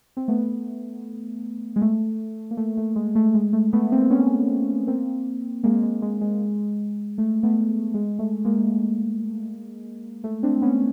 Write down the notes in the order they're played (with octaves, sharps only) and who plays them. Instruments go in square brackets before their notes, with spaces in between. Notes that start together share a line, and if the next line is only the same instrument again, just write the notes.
[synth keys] C4
A3 B3
G#3
A3
A#3
A3
A3
G#3
A3
G#3
A3
A3 B3
A#3 C4
B3 C#4
A#3 C4
G#3 A#3
G#3
G#3
G#3
A3
A3 B3
G#3
A3
G#3 A#3
A3
C4 D4
B3 C#4